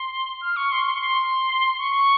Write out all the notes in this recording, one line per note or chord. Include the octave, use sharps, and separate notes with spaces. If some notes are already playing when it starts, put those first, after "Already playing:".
Already playing: C6
F6
C#6
C6
C6
C#6
C6
C#6